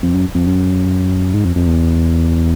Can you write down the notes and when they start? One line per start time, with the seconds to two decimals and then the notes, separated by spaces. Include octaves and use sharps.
0.03 F2
0.14 F#2
0.35 F2
0.47 F#2
1.34 G#2
1.45 F2
1.56 F2
1.67 E2